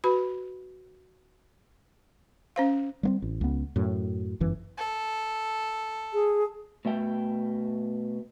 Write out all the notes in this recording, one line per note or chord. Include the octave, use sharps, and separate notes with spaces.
F#4 B4 B5
C#4 C5 F5
G3 A#3 C4
A1
C#2 B3
F#2 A2
G1 F#2 E3
A4
G#4
B2 A3 E5 G5